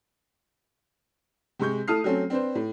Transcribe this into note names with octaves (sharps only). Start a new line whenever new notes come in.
C3 G#3 C#6 G6
A3 E4 A5 D#6 F6 C7
F#3 A3 C4 C#4 A4
C4 D4 B4 C5
A2